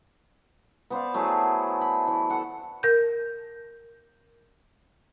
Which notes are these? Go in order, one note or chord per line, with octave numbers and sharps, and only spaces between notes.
B3 C5 D5 F5
F#3 A3 E4 G#4
B5
E3
A4 F#5
A#4 G6